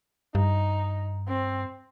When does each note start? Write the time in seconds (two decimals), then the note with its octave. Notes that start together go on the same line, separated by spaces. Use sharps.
0.35 G2 D#4
1.28 C4